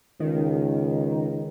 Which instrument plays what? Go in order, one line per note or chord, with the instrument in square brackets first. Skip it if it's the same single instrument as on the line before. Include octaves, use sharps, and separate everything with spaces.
[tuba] C#2 [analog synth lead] D#3